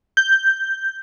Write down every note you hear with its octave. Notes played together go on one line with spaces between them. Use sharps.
G6